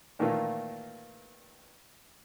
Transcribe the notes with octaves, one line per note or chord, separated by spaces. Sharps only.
A#2 D#3 E3 A3 A#3 F4